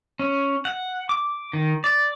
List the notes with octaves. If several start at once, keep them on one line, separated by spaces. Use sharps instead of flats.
C#4
F#5
D6
D#3
D5